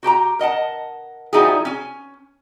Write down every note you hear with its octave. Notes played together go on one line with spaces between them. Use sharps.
F#4 G4 A5 A#5
A#4 D#5 F#5 A5
F3 G3 D#4 E4 F#4 G#4
C#4 G#5